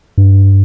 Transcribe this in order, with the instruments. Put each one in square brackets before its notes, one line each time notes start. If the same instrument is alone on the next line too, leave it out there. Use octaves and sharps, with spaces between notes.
[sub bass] G2